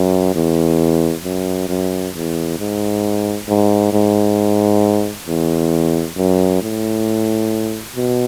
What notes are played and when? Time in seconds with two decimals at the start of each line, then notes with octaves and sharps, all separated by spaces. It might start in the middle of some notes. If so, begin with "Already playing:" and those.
Already playing: F#2
0.34 E2
1.24 F#2
1.68 F#2
2.14 E2
2.59 G#2
3.48 G#2
3.93 G#2
5.27 E2
6.17 F#2
6.62 A2
7.96 B2